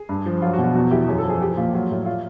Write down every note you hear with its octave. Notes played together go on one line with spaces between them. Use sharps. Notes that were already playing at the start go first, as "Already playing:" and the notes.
Already playing: G#4
G2
F3
F#3 F4
F#4
B2
F#4
E2 F#4
E3 G4
F#2 G#4
A4
F3
G#4
F3 G4
A#2 F4
F#3 F4
A2
F4